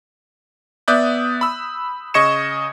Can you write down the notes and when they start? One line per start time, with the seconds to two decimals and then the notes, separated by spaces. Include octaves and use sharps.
0.88 B3 D5 E5 D#6 F#6 G6
1.41 B5 E6
2.14 C#3 D#5 C#6 G#6 C#7 E7